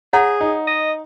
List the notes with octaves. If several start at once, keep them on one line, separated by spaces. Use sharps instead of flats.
G#4 C#5 F#5 A#5
D#4
D#5